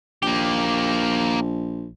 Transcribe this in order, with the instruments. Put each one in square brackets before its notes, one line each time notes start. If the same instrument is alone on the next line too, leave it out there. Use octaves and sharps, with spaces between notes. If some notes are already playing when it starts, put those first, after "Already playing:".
[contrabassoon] A#1 [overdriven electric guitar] A#3 G4